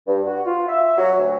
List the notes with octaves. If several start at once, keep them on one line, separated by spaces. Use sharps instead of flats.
G2
F#4
F4
E5
F#3
D2